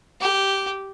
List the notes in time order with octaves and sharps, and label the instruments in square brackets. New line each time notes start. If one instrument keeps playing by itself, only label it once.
[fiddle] G4